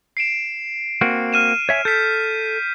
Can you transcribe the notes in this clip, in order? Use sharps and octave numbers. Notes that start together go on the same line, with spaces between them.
C7 D7 E7
A#3 C4 F#4
F6 D#7 E7
C#5 E5 G#5
A4 G6 B6